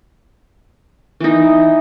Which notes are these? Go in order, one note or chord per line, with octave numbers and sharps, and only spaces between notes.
E3 D#4